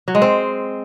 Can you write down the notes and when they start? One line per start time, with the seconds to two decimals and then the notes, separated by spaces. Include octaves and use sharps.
0.08 F#3
0.15 G#3
0.22 C4